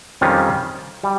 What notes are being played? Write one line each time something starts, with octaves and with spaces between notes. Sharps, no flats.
F2 D#3 G3 C#4 F4
G3